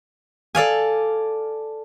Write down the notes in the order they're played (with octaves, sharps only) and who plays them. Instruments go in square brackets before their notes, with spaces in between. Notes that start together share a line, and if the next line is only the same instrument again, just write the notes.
[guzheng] A4 D5 F5 G#5